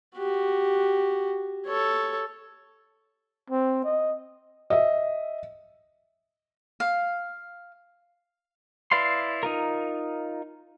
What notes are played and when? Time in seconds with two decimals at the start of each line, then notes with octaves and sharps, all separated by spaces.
0.16 F#4 G4
1.66 A4 C#5
3.50 C4
3.84 D#5
4.70 D#5 E5
6.80 F5
8.91 E4 B4 D5 F5 C6
9.43 D#4 F4 A#4